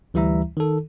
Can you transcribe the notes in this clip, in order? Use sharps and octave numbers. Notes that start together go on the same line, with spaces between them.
D2 E3 G3 E4 E5 A#5
D#3 A4